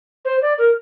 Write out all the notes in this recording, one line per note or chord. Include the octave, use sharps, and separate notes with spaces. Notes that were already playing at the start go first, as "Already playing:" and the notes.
C5
D5
A#4